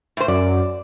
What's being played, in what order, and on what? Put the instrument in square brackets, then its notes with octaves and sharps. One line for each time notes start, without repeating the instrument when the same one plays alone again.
[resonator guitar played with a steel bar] A2 C5
[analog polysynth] F#2 [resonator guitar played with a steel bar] D5